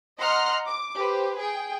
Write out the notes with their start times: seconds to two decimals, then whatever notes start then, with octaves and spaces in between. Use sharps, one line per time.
0.18 D#5 F#5 A#5 C6 F6
0.66 D6
0.97 G4 B4 C5
1.38 G#4 G5